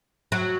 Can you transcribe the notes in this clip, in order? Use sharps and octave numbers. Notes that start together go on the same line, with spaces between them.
F#3